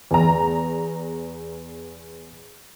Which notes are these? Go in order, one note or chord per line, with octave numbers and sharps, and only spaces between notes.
E2 A#5